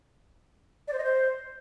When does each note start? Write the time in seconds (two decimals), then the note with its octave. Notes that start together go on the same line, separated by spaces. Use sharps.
0.88 D5
0.93 C5
0.98 D#5
1.03 C5